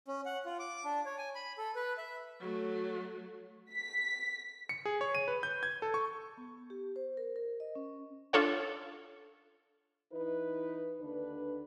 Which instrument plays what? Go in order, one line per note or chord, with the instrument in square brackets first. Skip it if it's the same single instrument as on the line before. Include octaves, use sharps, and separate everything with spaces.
[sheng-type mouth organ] C#4
F#5
F4
D6
D4
C#5
G#5
B5
A4
B4
E5
[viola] F#3 A3
[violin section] B6
[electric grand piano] C#7
G#4
C#5
D#7
B4
G6
G#6
A4
C#6
[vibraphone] B3
G4
C5
A#4
A#4
D#5
C#4
[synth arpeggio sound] D4 F4 A4 C#5 F#5
[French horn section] E3 D#4 E4 B4
D#2 D3 D4 B4